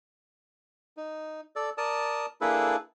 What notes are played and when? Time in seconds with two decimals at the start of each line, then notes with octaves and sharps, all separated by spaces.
0.97 D#4
1.56 A4 D5
1.78 A#4 D5 A5 D#6
2.41 A#3 D4 E4 G#4 A4 B4